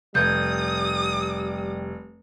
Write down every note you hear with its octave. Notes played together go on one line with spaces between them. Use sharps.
F1 G3 D#6 G6 G#6